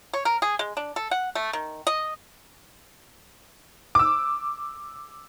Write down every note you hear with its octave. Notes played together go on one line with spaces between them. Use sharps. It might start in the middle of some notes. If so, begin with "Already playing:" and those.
C#5
A#4
G#4
G#3
D4
A4
F#5
A3
D#3
D#5
D6 E6